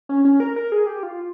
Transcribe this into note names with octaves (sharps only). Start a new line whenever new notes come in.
C#4
C#4
A#4
A#4
G#4
G4
F4